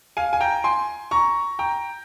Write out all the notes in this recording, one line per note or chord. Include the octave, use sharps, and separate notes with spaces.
F5 G#5
G#5
G5 A#5
G#5 C6
A#5 C#6
G5 A#5